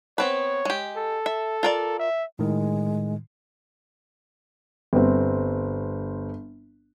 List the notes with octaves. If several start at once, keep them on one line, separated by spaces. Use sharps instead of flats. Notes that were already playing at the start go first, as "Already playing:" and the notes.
B3 C4 B4 C#5
G#3 G4
A4
E5
F4 A#4 D5
E5
A2 D#3 G#3
G1 C4